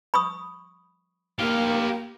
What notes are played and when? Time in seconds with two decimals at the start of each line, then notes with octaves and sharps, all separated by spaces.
0.14 B5 C#6 D#6
1.39 A#3 G4 F5